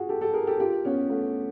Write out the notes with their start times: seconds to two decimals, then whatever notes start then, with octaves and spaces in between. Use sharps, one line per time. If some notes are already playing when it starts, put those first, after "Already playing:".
Already playing: F4 F#4 G#4
0.09 G4 A4
0.21 G4 A4
0.34 G#4 A#4
0.47 G4 A4
0.60 F4 G4
0.85 B3 C#4
1.10 A3 B3